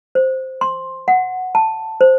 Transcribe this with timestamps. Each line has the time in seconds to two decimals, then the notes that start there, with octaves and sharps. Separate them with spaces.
0.15 C5
0.61 C6
1.08 F#5
1.55 A5
2.01 C5